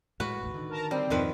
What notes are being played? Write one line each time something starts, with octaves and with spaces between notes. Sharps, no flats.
A2 G#3 F#4 B4
A#1 D#2 A2
D3 D#3
A#4 A5 A#5
G3 C4
E2 G2 B2 D#3 F3 B4